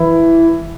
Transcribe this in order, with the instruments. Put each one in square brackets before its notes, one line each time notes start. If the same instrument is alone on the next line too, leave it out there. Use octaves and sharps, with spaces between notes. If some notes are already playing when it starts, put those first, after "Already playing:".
Already playing: [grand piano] E3 E4